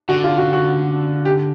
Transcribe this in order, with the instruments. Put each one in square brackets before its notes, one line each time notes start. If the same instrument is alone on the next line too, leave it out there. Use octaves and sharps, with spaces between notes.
[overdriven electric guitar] D3 [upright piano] F#4
[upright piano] F4
F#4
F#4
G4